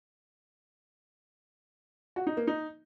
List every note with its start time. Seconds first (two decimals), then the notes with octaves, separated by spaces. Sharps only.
2.16 F#4
2.27 D#4
2.37 A#3
2.47 D#4